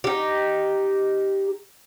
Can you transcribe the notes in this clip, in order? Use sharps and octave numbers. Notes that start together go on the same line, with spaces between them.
D#4 G4